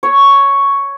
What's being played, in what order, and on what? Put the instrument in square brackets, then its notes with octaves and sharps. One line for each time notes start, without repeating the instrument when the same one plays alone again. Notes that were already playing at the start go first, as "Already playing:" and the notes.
[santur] C#5